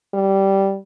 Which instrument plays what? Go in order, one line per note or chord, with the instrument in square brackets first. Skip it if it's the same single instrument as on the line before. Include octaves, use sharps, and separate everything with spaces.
[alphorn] G3